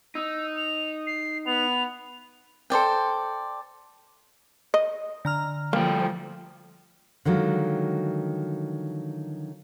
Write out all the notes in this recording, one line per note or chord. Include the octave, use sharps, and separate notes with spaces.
D#4 E6
F7
C7
B3 F7
A4 C5 D5 G5
D#5
D3 A#5 F6
F3 G3 A3 A#3 G5
D3 D#3 F3 F#3 G#3